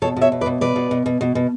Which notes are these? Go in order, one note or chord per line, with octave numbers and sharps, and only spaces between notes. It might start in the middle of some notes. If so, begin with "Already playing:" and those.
B2 A4 C#5
B2
C#5 E5
B2
B4 D5
B2
B2 B4 D5
B2
B2
B2
B2
B2